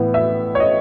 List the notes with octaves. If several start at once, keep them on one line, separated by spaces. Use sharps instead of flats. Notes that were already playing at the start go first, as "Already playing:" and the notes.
Already playing: A2 E3 B3
E5
C#5
D#5